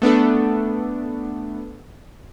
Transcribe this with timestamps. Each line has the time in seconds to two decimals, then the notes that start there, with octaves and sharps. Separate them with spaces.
0.02 A3 B3 D4 A4